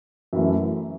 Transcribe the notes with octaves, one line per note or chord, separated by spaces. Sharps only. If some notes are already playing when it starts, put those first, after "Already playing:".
F#2 E3 A3